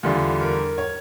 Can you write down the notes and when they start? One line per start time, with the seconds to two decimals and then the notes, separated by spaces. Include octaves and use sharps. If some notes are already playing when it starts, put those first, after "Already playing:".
0.03 E2 D3 G3 F4
0.40 A#4
0.78 C#5